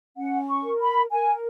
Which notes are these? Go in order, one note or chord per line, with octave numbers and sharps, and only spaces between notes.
C#4 F#5
C#6
A#4
B5
A#4 G#5